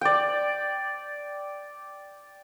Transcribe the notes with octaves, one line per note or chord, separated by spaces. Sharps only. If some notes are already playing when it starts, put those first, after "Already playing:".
D5 G5